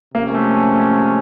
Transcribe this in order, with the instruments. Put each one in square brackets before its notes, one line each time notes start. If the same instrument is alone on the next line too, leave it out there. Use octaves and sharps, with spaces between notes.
[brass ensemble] C3 F3 G#3 C#4 [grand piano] A#3
[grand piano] A3
A3
A3
A3